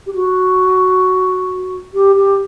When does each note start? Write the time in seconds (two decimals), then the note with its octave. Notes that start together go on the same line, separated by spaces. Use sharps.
0.06 G4
0.14 F#4
1.94 G4
2.16 G4